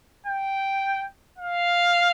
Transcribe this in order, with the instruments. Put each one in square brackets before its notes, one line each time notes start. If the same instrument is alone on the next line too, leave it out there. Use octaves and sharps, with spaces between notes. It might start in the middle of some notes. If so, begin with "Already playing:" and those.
[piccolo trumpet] G5
F5